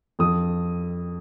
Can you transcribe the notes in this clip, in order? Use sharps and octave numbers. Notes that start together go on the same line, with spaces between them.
F2 D#6